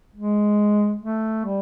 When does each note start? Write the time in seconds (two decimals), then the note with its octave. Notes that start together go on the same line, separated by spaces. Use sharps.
0.15 G#3
1.02 A3
1.45 G3